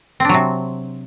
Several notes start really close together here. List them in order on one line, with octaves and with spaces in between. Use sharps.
C4 D4 F#3 C3